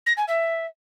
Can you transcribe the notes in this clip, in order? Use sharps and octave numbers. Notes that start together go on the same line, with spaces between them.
A#6
G#5
E5